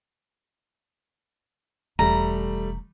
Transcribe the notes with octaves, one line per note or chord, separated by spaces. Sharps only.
E1 G3 A3 A#5